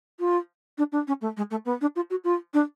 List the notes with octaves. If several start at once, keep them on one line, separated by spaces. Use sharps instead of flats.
F4
D4
D4
C#4
A3
G#3
A3
B3
D4
F4
F#4
F4
D4